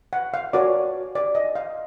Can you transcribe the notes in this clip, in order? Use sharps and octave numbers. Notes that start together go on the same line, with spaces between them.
F#5
F5
F#4 A#4 C#5 D5
D5
D#5
F5